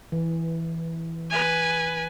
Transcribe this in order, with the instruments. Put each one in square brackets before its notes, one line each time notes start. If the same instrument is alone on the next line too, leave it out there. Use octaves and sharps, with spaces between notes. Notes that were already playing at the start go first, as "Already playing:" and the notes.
[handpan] E3
[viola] B4 G#5